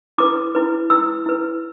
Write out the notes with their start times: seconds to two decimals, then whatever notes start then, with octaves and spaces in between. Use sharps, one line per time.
0.18 E4 B4 D6
0.55 E4 B4
0.90 E4 B4 E6
1.26 E4 B4